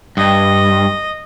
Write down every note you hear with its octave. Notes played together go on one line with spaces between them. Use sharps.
G2 D#5